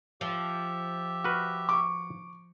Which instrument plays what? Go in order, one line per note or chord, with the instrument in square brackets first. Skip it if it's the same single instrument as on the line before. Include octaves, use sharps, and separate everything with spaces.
[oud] F3 [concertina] G4 E5
[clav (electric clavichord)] F#4 B4 [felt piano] F6
[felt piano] C#6 D6